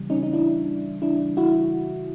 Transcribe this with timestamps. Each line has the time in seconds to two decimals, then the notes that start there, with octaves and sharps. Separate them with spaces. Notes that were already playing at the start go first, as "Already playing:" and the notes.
Already playing: C#3 E3 G3
0.10 C#4 D#4
0.23 D#4
0.33 D4 E4
1.02 D4 E4
1.37 E4 F#4